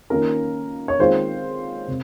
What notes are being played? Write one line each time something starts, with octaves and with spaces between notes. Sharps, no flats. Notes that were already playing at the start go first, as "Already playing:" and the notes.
D#3 A#3 C#4 F4 A#4
C#5
D#3 G#3 C4 F4 C5
C3